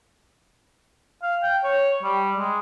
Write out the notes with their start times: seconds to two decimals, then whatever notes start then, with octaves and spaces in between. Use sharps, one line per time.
1.22 F5
1.43 G5
1.64 C#5
2.03 G3
2.35 G#3